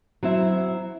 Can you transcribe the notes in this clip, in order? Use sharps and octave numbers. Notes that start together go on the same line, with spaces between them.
F#3 C4 E4 E5